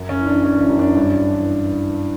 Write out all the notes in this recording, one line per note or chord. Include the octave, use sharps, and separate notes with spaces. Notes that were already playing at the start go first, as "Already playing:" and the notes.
Already playing: F#2
C#4
E3
D4
E3 C#4
C#4
F#2
D4
G2
E3